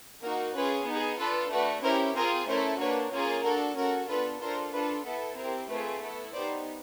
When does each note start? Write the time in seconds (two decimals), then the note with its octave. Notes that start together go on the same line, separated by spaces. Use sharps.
0.23 A#3 D#4 F#4 A#4
0.55 C#4 F4 G#4 B4
0.87 B3 D#4 G#4
1.19 D4 F4 A4 B4
1.51 A3 D4 F#4 B4
1.84 C#4 E4 G4 A#4 C5
2.16 C4 F4 G#4 A#4 C5
2.48 A3 C#4 E4 A4 A#4 C5
2.80 A#3 D4 F#4 B4 C#5
3.12 A#3 C#4 F4 G#4
3.45 D4 F#4 A4 A#4
3.76 C#4 F#4 A4 A#4
4.09 B3 D4 F4 A4 B4
4.41 D4 F4 A4 A#4 C5
4.73 D4 F4 A4 B4
5.06 B3 E4 A4
5.37 C4 E4 G4 A#4
5.69 A3 C4 F4 G#4 B4
6.01 B3 E4 A4
6.33 B3 D#4 G4 C5 D5